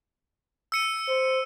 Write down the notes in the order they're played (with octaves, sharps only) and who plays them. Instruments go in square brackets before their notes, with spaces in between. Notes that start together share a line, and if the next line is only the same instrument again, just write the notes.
[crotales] E6 C#7 D#7
[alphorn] C5